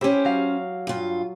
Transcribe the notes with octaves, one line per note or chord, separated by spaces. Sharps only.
C#4 E4 G4 C5
F#3 F5
G2 F4